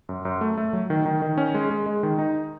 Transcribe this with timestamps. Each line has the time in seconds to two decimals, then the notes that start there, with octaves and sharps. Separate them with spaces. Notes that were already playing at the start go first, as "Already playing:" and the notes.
0.09 F#2
0.25 F#2
0.41 A3
0.58 A3
0.73 F#3
0.90 D#3
1.06 D#3
1.22 D#3
1.38 C#4
1.54 G#3
1.70 G#3
1.86 G#3
2.03 D#3
2.19 D#4